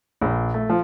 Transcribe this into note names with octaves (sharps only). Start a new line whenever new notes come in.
A#1
A3
F3